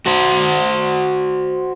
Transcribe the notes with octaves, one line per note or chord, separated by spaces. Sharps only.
F#4 C5